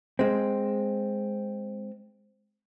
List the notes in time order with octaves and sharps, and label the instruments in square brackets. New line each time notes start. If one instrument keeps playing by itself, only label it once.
[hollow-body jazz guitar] G#3 C4